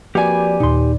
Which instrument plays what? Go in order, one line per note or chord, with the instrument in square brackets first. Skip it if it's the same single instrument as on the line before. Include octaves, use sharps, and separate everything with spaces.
[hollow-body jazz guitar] F2 A#3 F#4 [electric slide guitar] G4 G#5 [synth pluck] B4 D5
[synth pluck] D#2 A#2 [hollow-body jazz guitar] D#4 C6